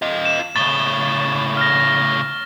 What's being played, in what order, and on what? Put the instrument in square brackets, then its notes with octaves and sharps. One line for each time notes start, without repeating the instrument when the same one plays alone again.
[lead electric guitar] F4 D#5
[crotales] E7
[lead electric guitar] A2 C#3 [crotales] A6 G7
[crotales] F6 A#6